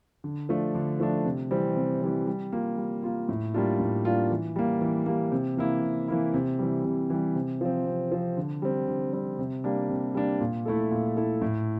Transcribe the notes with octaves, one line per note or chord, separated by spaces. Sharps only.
D3
F3 A3 D4
D3
F3 A3 D4
C3
E3 G3 C4
C3
E3 G3 C4
G3
A#3 F4
G3
A#3 F4
A2
G3 A#3 D4 F4
A2
G3 A#3 D4 F4
E3
G3 A#3
E3
G3 A#3
C3
E3 A#3 E4
C3
E3 A#3 E4
C3
E3 G3
C3
E3 G3
C3
F3 C4
C3
F3 C4
D3
G3 C4
D3
G3 C4
C3
G3 A#3 D4
C3
G3 A#3 D4
A#2
A3 E4 A4
A#2
A3 E4 A4
A2